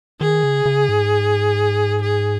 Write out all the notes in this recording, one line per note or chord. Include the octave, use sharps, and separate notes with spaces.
D#3 G#4
C#3
C#3
G#2
G#4